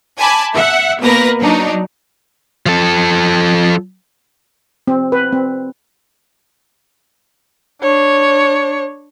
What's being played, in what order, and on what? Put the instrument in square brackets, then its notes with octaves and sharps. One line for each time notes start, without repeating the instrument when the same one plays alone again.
[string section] G#5 A5 B5 D6
E5 F#5
B2 A#3 A#4 B4 A#6
F#3 D4 D#4
[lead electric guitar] F3 A4
[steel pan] C4
B4
C4
[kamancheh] D4 C#5